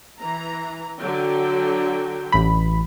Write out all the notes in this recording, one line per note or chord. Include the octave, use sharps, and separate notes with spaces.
E3 A#5
D3 F#3 G5
A1 B5